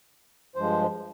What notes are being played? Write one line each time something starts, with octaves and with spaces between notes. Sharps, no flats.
G2 F3 G#3 C5